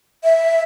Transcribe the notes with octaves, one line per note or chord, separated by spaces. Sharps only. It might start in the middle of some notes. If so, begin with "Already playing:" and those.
E5